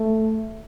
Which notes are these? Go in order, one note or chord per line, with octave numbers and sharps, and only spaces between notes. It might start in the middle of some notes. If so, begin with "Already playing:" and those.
Already playing: A3